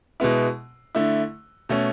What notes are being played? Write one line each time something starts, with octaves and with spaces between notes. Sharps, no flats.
B2 G#3 B3 E4
D3 A3 E4
B2 A3 C#4